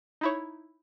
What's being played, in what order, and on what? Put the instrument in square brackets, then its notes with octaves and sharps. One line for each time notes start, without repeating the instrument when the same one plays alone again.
[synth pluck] D#4 E4 C#5